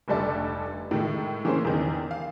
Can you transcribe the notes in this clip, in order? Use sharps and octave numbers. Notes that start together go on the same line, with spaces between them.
F1 D2 G3 A4 D5
A2 D#3 G#3
E3 A#3 C#4 G#4 C5
E2 D#3
F5